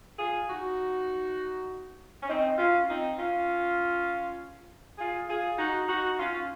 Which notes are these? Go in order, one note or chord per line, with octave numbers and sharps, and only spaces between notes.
F4 G#4
D#4 F#4
C#4
C4 D#4
C#4 F4
C4 D#4
C#4 F4
F4 G#4
F4 G#4
D#4 F#4
D#4 F#4
C#4 F4